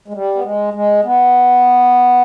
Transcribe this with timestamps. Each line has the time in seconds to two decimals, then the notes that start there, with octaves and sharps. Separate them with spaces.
0.08 G#3
0.14 G3
0.35 B3
0.44 G#3
0.74 G#3
1.04 B3